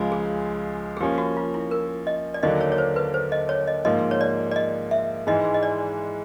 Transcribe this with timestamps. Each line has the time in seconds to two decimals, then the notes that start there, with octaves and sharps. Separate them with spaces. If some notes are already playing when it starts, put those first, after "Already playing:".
Already playing: C#2 C#3 F3 G#3
0.12 G#4
0.97 G#4
1.00 F3 A#3 C#4 G4
1.18 F#4
1.37 F4
1.54 E4
1.71 A#4
2.07 D#5
2.34 D5
2.43 D#2 D3 F#3 A#3 D4 D#5
2.61 C#5
2.72 C#5
2.78 C5
2.96 B4
3.14 C5
3.32 D#5
3.49 C#5
3.68 D#5
3.85 G#2 F3 A#3 D#5
4.11 C#5
4.21 D5
4.51 D5
4.56 D#5
4.91 E5
5.27 G#2 E3 G#3 D#5
5.54 D#5
5.63 D5